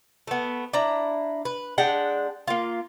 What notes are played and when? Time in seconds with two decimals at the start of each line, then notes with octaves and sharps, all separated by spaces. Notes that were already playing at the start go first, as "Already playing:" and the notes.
0.27 A3 B3
0.73 D4 E4 A#5
1.45 B4
1.78 G#3 D4 F#5 G5
2.48 A#3 F4